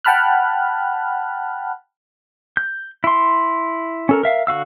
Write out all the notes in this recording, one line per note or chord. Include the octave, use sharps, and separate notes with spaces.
F#5 G5 A5 B5 F6 F#6
G6
E4 C6
C#4 A4 A#4
A#4 E5 F5
D3 F#4 F5 E6